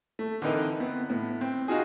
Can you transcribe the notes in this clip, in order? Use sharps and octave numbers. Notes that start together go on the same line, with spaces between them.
A3
D3 E3 C4 D#4 A#4 B4
B3 C4
A2 B3
C4
D#4 F4 F#4 G#4